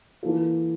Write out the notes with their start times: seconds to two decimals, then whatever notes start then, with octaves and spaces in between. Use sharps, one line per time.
0.23 E3 A#3 F4 A4